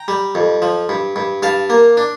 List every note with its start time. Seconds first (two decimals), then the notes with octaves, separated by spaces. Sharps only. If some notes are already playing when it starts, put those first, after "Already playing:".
Already playing: G5 A#5
0.08 G3
0.35 F2
0.62 F3
0.89 G2
1.16 G2
1.43 G2 F5 A5
1.70 A#3
1.97 D4